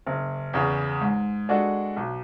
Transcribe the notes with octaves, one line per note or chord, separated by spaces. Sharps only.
F#1
E2 C#3
G#2
G#3 D4 F#4 A4
B1